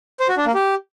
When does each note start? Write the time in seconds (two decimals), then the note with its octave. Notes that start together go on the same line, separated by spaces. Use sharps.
0.20 C5
0.29 F#4
0.37 D4
0.46 A#3
0.54 G4